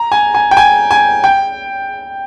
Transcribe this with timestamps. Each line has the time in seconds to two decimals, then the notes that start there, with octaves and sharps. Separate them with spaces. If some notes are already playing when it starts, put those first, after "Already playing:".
Already playing: A#5
0.12 G#5
0.34 G#5
0.51 G5
0.57 G#5
0.91 G#5
1.24 G5